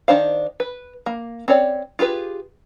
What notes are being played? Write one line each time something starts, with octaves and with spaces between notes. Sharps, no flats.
D#3 D4 C5 F5
B4
A#3
C4 C#4 C#5 D5
F4 G4 G#4 B4